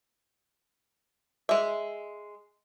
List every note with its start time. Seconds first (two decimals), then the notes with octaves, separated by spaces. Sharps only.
1.49 G#3 E5